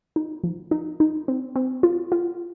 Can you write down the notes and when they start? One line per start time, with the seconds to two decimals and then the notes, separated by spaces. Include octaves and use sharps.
0.16 D#4
0.43 F3
0.71 D#4
1.00 D#4
1.28 C4
1.56 C4
1.83 F4
2.12 F4